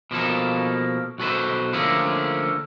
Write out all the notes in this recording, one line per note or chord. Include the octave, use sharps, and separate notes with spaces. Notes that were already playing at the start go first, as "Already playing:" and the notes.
B2 F3 A#3 A4
B1 F#4 A4 B4 C5
D3 F3 A3 A#3 C#4 G#4